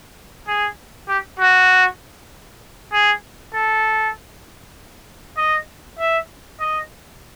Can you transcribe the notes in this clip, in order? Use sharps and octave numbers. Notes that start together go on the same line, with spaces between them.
G#4
G4
F#4
G#4
A4
D#5
E5
D#5